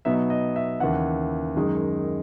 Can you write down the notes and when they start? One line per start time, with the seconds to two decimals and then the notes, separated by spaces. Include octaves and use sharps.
0.05 B2 F#3 B3 D#4 E5
0.30 D#5
0.56 E5
0.80 D#2 C#3 E3 F#5
1.56 F#2 D#3 G#3 D#4